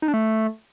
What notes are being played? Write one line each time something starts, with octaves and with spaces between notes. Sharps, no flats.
D#4
D4
A3